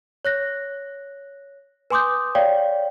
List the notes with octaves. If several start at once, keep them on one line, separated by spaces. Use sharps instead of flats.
C#5 F#6 A#6
B4 G#5 C6 D6 D#6 G6
C#5 D5 F5 G5